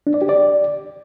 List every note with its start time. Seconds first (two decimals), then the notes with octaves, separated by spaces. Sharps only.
0.07 D4
0.14 D5
0.22 G4
0.29 D5